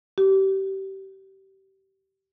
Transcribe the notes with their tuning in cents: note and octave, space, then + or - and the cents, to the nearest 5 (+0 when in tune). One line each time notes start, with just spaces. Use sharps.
G4 -25